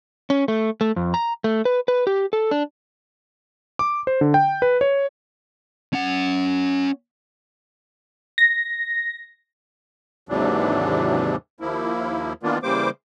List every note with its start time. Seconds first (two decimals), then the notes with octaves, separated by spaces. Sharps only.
0.30 C#4
0.48 A3
0.81 A3
0.96 F2
1.14 A#5
1.44 A3
1.65 B4
1.88 B4
2.07 G4
2.33 A4
2.51 D4
3.79 D6
4.07 C5
4.21 D3
4.34 G5
4.62 B4
4.81 C#5
5.93 C#4 F#5
8.38 A#6
10.29 D#2 G#2 C3 E3 F#3 D4
11.60 D#2 F3 A#3 E4
12.43 D#3 E3 A#3 B3 D4 F4
12.63 C#3 E3 G3 A#3 C5 D6